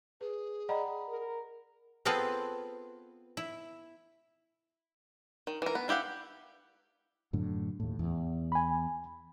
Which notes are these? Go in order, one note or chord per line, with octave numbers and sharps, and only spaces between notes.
G#4 B4
D5 D#5 F#5 G5 A#5 B5
A#4
B3 C4 F4 G#4 A4 B4
E4
D#3
E3 A#4
B3
D4 E4 G4 F5 F#5
F#2 A2 D3
D#2 A2
E2
G#5 B5